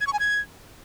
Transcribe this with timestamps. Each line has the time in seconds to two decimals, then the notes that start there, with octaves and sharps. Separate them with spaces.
0.01 G#6
0.07 C#6
0.13 G#5
0.19 G#6